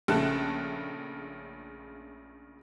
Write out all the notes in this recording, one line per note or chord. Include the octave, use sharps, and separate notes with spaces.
A#1 C#3 A3 A5 F#6